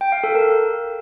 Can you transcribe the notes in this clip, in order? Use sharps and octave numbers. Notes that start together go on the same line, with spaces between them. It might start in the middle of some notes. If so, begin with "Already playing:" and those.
G5
F5
A4
A#4